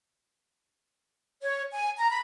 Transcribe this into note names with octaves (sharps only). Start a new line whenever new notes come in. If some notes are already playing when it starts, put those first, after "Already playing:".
C#5
G#5
A#5
B5